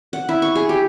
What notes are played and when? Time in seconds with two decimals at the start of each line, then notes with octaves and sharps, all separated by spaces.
0.13 F#5
0.29 E4
0.42 C#6
0.55 G#4
0.69 G4